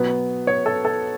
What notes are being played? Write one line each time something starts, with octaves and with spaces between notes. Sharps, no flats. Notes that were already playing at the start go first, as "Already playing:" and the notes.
Already playing: B2 F#3 B3
C#5
A4
A4